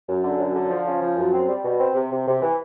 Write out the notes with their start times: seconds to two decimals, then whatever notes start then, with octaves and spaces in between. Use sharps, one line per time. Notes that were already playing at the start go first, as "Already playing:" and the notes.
0.08 F#2
0.24 D3
0.38 F#2
0.54 D3
0.70 F3
0.86 C#3
1.02 F3
1.17 F#2
1.32 C4
1.48 G3
1.63 B2
1.79 C4
1.94 C3
2.10 C3
2.27 C3
2.42 E3